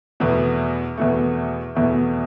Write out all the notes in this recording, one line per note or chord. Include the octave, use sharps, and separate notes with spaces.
E2 B2 A3
E2 B2 A3
E2 B2 A3